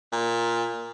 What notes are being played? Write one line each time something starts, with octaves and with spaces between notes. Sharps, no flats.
A#2